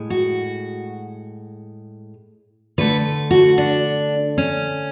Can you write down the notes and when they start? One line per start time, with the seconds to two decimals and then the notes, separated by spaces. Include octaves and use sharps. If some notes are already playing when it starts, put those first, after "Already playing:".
Already playing: A2 G#3
0.10 F#4
2.78 D3 A3 B4
3.31 F#4
3.58 D4
4.38 C#4